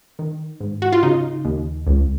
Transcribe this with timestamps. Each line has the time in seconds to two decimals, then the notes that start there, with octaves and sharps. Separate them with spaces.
0.19 D#3
0.61 G#2
0.82 F#4
0.92 F4
1.03 C#3 D#4
1.45 D#2
1.87 C#2